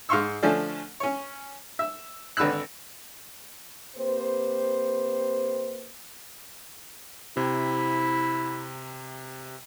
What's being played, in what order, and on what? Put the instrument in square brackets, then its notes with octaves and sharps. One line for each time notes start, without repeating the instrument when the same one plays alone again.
[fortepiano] G#2 F5 C6 C#6 E6
D3 F3 A3 C#4 D4
C#4 C#5
E5
G#1 D3 B4 E6 F#6
[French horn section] A#3 C4 G4 B4 C5
[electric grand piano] C3 [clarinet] E4